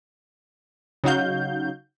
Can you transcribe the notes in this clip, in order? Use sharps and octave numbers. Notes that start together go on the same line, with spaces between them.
C#3 F#3 D#4 F#4 F5 G6